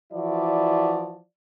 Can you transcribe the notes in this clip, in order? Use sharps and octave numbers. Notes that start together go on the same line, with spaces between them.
E3 F3 E4 F#4 D5